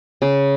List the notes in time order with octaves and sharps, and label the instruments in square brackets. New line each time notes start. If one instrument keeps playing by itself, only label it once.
[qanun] C#3